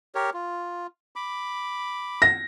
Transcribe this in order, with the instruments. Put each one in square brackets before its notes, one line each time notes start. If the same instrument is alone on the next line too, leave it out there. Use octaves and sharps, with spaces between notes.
[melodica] G4 A#4 C#5
F4
B5 D6
[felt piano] A#6